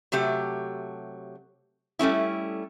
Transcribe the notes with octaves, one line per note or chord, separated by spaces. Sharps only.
C3 F#3 A3 G4
G3 A3 C#4 E4